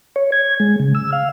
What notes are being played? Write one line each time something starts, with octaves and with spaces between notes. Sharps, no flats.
C#5
G#6
G#3
C#3
E6
F5